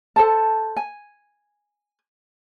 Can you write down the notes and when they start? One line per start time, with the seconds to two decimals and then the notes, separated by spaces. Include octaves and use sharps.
0.16 A4 C5 A5
0.76 G#5